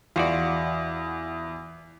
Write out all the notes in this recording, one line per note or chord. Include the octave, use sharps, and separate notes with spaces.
E2 F4 F#4 D5